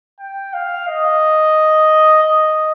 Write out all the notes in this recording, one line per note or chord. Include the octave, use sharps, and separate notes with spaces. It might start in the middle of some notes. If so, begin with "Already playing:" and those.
G5
F5
D#5
D#5